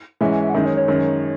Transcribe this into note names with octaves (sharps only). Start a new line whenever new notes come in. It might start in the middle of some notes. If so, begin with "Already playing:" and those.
G#2 E3 G#3 C#4 E5
E5
E5
F#5
F#2 D#3 G#3 D#4 E5
C#5
C#5
F#2 D#3 G#3